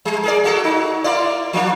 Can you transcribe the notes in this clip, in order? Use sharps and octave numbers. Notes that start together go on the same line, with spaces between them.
G3
G#4 A#4 D5
A#3 F#4 A4
D#4 F#4
A#3 E4 D5
F3 A#3 D4